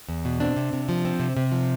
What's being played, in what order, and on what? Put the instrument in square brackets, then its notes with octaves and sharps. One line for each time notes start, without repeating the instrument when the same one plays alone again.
[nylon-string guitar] E2
B2
C4 D4
C3
C3
F3
C4
C3
C3
F3